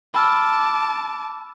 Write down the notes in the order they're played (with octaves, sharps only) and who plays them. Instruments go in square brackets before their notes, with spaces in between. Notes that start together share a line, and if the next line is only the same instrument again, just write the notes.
[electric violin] A5 D6 [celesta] B5 E6 F6